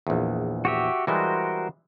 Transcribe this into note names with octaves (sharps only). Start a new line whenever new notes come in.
A#1 E2
F#4 G4 E5
E3 G3 G#3 F#4 A#4 C5